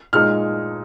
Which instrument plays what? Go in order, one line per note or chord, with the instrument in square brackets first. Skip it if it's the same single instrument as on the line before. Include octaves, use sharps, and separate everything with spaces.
[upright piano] A#2 G#3 D#4 F6